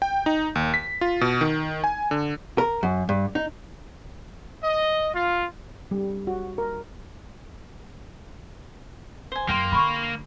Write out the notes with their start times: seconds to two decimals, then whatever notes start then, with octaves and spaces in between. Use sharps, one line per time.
0.02 G5
0.26 D#4
0.55 D#2
0.74 B6
1.01 F4
1.21 B2
1.41 D#3
1.84 G#5
2.11 D3
2.58 A#4
2.83 F#2
3.09 G2
3.35 D#4
4.64 D#5
5.15 F4
5.91 G3
6.27 F#4
6.58 A#4
9.32 C5 G#5
9.49 F#2 A#3 G5 C6
9.72 D3 B5 C#6